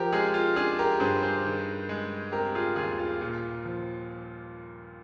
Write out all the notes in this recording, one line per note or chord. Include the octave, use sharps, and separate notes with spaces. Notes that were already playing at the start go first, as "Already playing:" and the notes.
Already playing: F3 G4 A#4
G#3 F4 G#4
F4
D4 F4 G#4
G4 A#4
G2 G#4 C5
G#4 C5
D#3
G#3
C4 G4 A#4
F4 G#4
D#2 F4 G#4
F4
A#2
F3